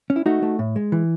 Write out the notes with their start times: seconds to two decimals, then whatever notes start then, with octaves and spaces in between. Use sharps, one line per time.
0.10 C#4
0.16 E4
0.26 A3 D#4 F#4
0.43 A3
0.59 A2
0.76 G#3
0.92 E3